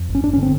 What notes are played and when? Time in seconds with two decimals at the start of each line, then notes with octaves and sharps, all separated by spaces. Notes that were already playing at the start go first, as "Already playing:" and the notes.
Already playing: F2
0.09 G1
0.15 C#4
0.23 G1 D4
0.33 C#4
0.37 D3
0.43 C4